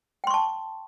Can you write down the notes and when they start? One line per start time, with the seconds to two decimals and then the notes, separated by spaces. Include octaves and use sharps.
0.24 G5
0.27 C6
0.30 C#6
0.34 A5